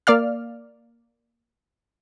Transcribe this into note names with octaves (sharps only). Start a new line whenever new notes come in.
A#3 D5 F5 F6